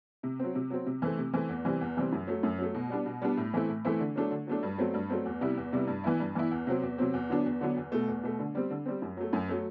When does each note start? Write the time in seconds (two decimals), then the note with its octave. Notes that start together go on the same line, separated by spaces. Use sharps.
0.23 C3
0.39 F#3 C4
0.55 C3
0.70 F#3 C4
0.86 C3
1.02 E3 A3 C4
1.18 C3
1.33 E3 A3 C4
1.49 E2
1.65 C3 E3 G3 C4
1.81 E2
1.97 C3 E3 G3 C4
2.12 F#2
2.27 F#3 A3
2.43 F#2
2.58 F#3 A3
2.75 B2
2.90 G3 B3 D4
3.06 B2
3.22 G3 B3 D4
3.37 A2
3.54 E3 A3 C4 E4
3.69 A2
3.85 E3 A3 C4 E4
4.00 D3
4.16 F#3 A3 D4
4.31 D3
4.47 F#3 A3 D4
4.63 G2
4.78 F#3 A3 C4
4.94 G2
5.10 F#3 A3 C4
5.25 E2
5.41 C3 G3 B3 E4
5.57 E2
5.73 C3 G3 B3 E4
5.88 G2
6.04 E3 B3 E4
6.20 G2
6.35 E3 B3 E4
6.51 E2
6.67 C3 F#3 C4
6.82 E2
6.98 C3 F#3 C4
7.14 E2
7.29 D3 F#3 B3 D4
7.45 E2
7.61 D3 F#3 B3 D4
7.77 E2
7.92 B2 A3
8.08 E2
8.23 B2 A3
8.39 D3
8.55 G3 C4
8.71 D3
8.86 G3 C4
9.02 F#2
9.17 F#3 A3
9.33 F#2
9.48 F#3 A3